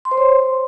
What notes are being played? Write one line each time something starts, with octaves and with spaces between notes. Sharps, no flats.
C6
C5
C#5